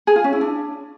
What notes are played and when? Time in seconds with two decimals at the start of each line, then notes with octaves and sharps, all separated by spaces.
0.07 G#4
0.16 F4
0.24 C#4
0.33 E4
0.41 D4